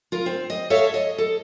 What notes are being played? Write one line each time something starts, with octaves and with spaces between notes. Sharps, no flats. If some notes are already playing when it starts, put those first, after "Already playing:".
F4 A#4
C4
D#5
A4 C#5 E5 F5
D#5
A4